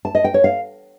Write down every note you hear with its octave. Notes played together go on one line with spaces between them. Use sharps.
A5
D#5
G5
C#5
F5